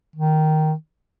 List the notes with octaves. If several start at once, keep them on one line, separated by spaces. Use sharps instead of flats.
D#3